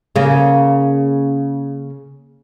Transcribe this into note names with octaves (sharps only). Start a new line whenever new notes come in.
C#3 A#3